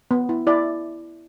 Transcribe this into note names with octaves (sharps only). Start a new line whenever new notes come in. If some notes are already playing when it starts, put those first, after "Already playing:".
B3
E4
E4 D5